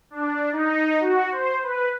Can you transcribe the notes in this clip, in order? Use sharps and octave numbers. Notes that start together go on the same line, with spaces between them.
D4
D#4
F#4
C5
B4